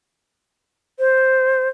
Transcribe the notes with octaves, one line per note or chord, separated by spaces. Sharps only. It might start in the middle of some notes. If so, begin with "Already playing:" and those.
C5